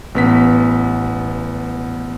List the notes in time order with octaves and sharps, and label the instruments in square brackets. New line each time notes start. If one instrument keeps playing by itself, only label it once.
[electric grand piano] A1 B3 B6